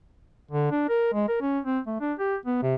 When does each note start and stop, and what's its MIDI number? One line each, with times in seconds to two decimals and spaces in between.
0.51 0.71 50
0.71 0.89 62
0.89 1.12 70
1.13 1.28 56
1.28 1.37 70
1.41 1.59 61
1.65 1.79 60
1.87 1.96 57
2.01 2.14 62
2.19 2.36 67
2.46 2.58 59
2.62 2.75 48